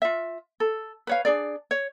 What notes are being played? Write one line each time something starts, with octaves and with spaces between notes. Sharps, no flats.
F4 E5
A4
B4 C#5 F5
D4 G#4 D5
C#5